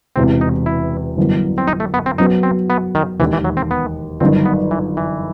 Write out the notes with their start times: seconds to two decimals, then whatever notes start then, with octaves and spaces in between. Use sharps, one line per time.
0.16 E1 E2 C3 C4
0.41 D#4
0.66 E4
1.17 G1 F#2 E3 B3
1.58 C4
1.68 D#4
1.80 A3
1.94 B3
2.06 C4
2.18 F#2 F#3 B3 D#4
2.43 C4
2.70 B3
2.95 D#3
3.19 E1 D#2 D#3 E3
3.33 E3
3.44 F#3
3.57 C4
3.71 B3
4.20 G1 F#2 D#3 C4
4.46 B3
4.71 E3
4.97 E3